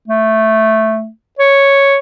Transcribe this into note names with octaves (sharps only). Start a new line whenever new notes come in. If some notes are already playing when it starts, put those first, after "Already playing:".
A3
C#5